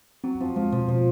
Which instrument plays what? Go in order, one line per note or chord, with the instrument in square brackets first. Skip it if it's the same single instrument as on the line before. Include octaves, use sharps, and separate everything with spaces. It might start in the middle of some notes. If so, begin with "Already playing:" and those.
[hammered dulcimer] F#3 [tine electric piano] C4
[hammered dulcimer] F3 [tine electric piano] C4
[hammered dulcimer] F3 [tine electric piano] G#3
[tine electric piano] B2 [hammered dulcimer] F3
[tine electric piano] B2 [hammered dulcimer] F3